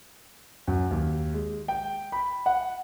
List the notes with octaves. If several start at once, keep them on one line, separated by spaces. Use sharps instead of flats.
F#2
D#2
G#3
G5
B5
F#5